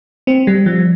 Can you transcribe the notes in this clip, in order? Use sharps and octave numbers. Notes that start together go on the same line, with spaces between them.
C4
G3
F3